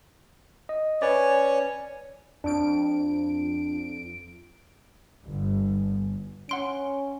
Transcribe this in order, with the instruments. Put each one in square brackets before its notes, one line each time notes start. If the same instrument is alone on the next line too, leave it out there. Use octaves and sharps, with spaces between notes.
[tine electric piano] D#5
[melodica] C#4 C#5 [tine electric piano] B4 D5
[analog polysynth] F2 D7 [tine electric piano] D4
[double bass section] G1
[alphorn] C#4 [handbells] F#5 C6 D7